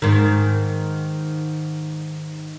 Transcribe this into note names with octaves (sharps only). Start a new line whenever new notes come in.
G#2 D#3